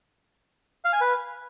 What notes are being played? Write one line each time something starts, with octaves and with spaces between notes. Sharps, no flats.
F5
G#5
B4